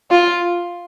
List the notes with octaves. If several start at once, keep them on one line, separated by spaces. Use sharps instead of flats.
F4